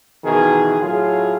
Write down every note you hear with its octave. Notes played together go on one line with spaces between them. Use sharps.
B2 D#3 E3 G#4
A2 F#3 F4 G#4